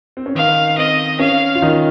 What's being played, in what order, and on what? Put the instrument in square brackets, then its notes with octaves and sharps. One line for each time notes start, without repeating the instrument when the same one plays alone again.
[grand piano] C4
C#4
[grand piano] D#3 D#4 [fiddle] F5
[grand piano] C4 [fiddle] D#5
[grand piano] C#4 [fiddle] F5
[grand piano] F4
D#3 D#4